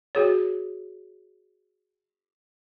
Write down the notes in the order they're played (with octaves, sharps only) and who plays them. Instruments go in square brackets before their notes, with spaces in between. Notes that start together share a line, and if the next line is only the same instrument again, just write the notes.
[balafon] F#4 G#4 C#5